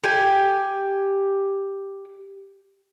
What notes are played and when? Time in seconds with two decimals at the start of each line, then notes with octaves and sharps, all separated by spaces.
0.04 G4 G#5